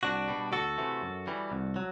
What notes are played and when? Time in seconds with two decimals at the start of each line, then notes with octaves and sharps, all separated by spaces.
0.03 C2 D4 F#4
0.28 B2 G3
0.52 D2 F#4 A4
0.78 C3 E3 A3
1.02 F#2
1.27 E3 G3
1.52 C2
1.76 F#3